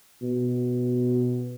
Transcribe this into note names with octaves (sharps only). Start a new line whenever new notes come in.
B2